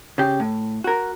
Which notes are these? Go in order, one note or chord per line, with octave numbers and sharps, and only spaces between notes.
C#3 G4
A2
F#4 A#4